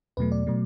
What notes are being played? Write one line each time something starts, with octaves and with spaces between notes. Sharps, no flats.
E2 B2 F#3 A3 B4
D5
B2 F#3 A3